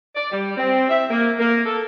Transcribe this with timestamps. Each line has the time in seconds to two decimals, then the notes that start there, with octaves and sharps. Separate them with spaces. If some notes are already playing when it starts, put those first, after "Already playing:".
0.15 D5
0.31 G3
0.57 C4
0.89 E5
1.10 A#3
1.39 A#3
1.65 A4